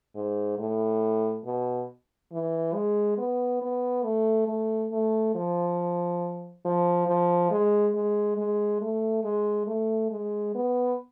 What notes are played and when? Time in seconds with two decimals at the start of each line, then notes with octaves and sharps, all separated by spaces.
0.15 G#2
0.58 A2
1.45 B2
2.32 E3
2.74 G#3
3.18 B3
3.62 B3
4.04 A3
4.47 A3
4.92 A3
5.35 F3
6.65 F3
7.07 F3
7.51 G#3
7.95 G#3
8.37 G#3
8.81 A3
9.24 G#3
9.67 A3
10.11 G#3
10.55 B3